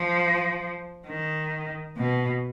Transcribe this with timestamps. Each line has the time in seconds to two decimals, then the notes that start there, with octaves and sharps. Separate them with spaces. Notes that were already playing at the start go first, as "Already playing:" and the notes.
Already playing: F3
1.08 D#3
1.97 B2